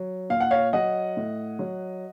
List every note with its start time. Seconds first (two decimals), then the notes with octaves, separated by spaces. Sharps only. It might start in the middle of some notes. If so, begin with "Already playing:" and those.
Already playing: F#3
0.30 A#2 F5
0.40 F#5
0.51 C#5 F5
0.73 F#3 D#5 F#5
1.17 A2
1.59 F#3